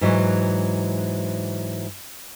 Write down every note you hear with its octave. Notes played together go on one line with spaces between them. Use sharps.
G#2 E3 F#3